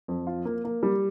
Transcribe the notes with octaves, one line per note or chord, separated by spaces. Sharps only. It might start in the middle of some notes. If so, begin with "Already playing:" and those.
F2
F4
A#3
A#3
G3